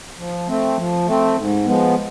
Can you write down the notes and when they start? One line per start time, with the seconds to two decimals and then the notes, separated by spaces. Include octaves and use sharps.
0.18 F3
0.48 A3 C4
0.77 F3
1.06 A3 C4
1.36 G#2
1.65 F3 G#3 B3